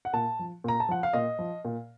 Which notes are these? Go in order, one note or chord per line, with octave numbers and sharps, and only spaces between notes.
F#5
A#2 A5
F3
A#2 A#5
A5
F3 F#5
F5
A#2 D#5
F3
A#2